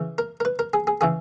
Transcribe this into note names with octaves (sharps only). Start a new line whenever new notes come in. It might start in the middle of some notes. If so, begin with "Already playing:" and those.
Already playing: C#3 E3
A#4
A#4
B4
A#4
G#4
G#4
C#3 E3 G#4